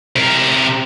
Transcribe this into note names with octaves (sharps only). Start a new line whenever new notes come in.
C3 A#4